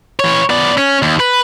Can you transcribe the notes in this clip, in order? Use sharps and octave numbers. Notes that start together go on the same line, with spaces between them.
E3 C#5
B3 D5
C#4
D#2
B4